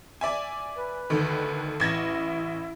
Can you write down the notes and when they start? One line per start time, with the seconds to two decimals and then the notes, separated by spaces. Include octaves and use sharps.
0.21 D5 E5 G#5
0.76 B4
1.10 D2 D3 D#3
1.80 A1 E4 G#6 A#6